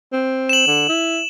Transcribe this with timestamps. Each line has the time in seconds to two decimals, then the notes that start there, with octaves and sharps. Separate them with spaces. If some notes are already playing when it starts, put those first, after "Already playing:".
0.13 C4
0.49 E7 F#7
0.67 D3
0.89 E4